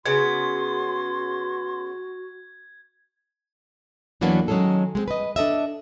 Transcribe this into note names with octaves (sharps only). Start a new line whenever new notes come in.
C#3 B3 F#4 C6 G#6
E2 E3 F#3 A#3 B3 D4
D#3 F#3 G#3 C#4 G#4 A4
G#3 A3 C4
B4 D#5
D4 A4 D#5 E5